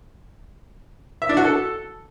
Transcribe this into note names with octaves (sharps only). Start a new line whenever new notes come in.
E5
D4
F#4
A4